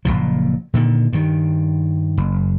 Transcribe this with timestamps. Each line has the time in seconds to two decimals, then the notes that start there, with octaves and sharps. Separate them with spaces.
0.05 F#1 C#2 A#2 F3
0.74 A#2 D3 D#3
1.13 G2 D#3
2.17 F#1